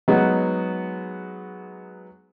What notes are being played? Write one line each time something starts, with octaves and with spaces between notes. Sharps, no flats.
F#3 G#3 B3 D#4 F#4